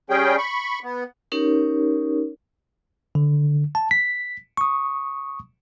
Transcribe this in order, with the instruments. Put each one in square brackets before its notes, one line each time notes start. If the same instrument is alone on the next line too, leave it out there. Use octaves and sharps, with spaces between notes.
[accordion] G3 C#4 G#4 G5
B5 C#6
B3
[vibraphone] C#4 D#4 G4 A#4 C#5
[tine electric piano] D3
A5
B6
C#6 D#6